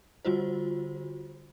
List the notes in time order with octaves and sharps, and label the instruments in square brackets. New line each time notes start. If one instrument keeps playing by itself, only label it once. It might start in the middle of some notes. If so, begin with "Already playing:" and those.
[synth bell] D3 G3 F4 F#4 C5